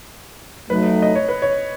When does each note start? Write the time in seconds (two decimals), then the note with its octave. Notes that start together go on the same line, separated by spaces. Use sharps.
0.69 F#3 A3 D#4 B4
1.02 D#5
1.15 C#5
1.28 B4
1.42 C#5